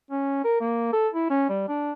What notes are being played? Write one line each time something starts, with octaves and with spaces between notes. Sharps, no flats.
C#4
A#4
A#3
A4
E4
C#4
G3
D4